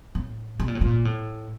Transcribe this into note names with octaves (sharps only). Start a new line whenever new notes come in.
A2
B2
A#2
A2
A#2
A2